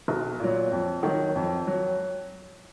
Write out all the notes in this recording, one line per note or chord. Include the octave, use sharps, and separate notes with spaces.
B1
A#2 F#3
F2
D#3 F#3
F2
F#3